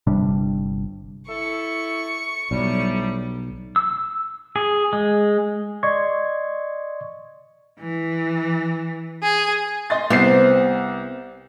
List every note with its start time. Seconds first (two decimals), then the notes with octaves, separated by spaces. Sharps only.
0.07 G1 C3 G3 D4
1.29 E4 A4 C#6
2.51 B1 A2 C3 G3
3.76 E6
4.56 G#4
4.93 G#3
5.83 D5 D#5 C6 C#6 G#6
7.79 E3
9.21 G#4
9.90 D#5 C6 A6
10.10 C2 B3 C4 C7